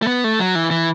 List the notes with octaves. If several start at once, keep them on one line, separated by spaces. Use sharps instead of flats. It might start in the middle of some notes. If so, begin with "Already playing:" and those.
A3
B3
A3
F#3
E3
E3